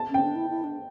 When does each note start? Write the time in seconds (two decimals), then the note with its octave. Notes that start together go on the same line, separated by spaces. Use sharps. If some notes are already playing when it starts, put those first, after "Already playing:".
Already playing: A5
0.10 C#4 G5
0.23 D4
0.35 E4
0.50 E4
0.64 D4